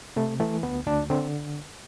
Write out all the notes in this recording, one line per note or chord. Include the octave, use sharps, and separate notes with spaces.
C3 A3
E3 A3
D2 B3
D2 D4
D3 C4